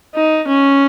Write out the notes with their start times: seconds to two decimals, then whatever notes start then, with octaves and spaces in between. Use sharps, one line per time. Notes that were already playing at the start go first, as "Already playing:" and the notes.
0.15 D#4
0.47 C#4